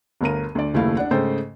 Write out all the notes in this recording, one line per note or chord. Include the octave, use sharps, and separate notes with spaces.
G1 D2 A#4 D#7
D2 D5
F#1 D#2 A3 E4 F5
D4 F#5
G#2 C#3 A3 A4 C5 G5